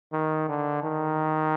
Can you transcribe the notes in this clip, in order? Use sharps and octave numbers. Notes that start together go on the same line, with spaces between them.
D#3
D3
D#3